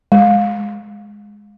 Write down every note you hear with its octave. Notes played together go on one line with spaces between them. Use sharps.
G#3